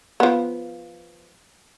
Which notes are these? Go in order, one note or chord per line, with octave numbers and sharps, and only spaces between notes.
F3 B3